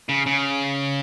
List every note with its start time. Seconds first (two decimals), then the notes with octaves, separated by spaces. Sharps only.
0.09 C#3
0.26 C#3